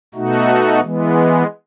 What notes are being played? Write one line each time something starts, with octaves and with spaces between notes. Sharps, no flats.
B2 A3 D#4 F#4
E3 G#3 B3